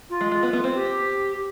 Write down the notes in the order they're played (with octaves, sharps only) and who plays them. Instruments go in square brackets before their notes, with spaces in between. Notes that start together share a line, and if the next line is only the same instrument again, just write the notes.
[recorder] F4
[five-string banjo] G#3
G#3
B3
B3
C4
[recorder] G4